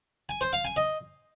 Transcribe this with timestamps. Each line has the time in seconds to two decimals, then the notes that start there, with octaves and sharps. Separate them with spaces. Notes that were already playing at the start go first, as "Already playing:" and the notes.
0.29 G#5
0.41 C5
0.53 F5
0.65 G#5
0.76 D#5